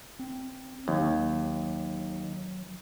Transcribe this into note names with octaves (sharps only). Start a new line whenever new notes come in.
C4
D#2 F#3